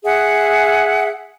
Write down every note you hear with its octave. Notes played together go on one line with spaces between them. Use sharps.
G#4 E5 F#5